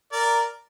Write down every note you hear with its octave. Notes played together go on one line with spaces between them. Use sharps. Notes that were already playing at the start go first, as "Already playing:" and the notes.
A#4 D5